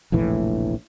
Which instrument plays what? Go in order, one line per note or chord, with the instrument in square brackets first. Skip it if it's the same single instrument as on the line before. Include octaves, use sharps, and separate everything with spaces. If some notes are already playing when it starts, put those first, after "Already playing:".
[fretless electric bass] F1 A#1 A2 E3